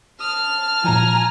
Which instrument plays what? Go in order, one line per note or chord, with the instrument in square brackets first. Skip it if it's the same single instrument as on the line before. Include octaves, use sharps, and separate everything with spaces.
[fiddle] A5 F6 [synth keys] D#6
[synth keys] A#2 F3 [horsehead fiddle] G#5 A#5